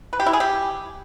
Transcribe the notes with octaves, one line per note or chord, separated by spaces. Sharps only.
B4
G4
E4
G#4
G4